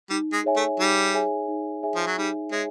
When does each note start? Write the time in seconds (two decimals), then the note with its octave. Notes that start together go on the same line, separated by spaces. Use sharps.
0.10 G3 D#4
0.33 G#3
0.44 G#4 C#5 E5 G#5
0.56 A3
0.79 G3 D#4
1.14 G#4 C#5 E5 G#5
1.48 D#4
1.83 G#4 C#5 E5 G#5
1.95 F3
2.07 F#3
2.18 G3 D#4
2.52 G#3 G#4 C#5 E5 G#5